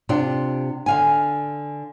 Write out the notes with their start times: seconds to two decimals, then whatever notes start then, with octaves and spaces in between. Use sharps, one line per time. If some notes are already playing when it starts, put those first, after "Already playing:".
0.09 C3 D4 F4 G4
0.86 D3 F5 G#5